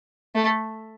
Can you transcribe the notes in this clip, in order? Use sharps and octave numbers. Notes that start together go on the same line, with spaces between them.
A3